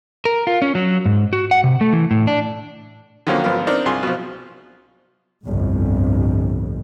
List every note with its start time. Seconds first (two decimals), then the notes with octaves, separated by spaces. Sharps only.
0.25 A#4
0.47 F4
0.62 C#4
0.75 F#3
1.06 G#2
1.33 F#4
1.51 F#5
1.64 C3
1.81 A3
1.93 E3
2.11 A2
2.27 D4
3.27 D3 D#3 F3 F#3 A#3 C#4
3.44 G#1 F3 B3 A#4 F5
3.67 C4 D4 D#4 A#4
3.86 C2 F4 G#4 C6
4.03 B2 F3
5.44 G1 C2 F2 A2